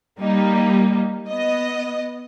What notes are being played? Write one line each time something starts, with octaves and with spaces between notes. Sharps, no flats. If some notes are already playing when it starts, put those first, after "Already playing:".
G3 A#3 D#4
B3 D#5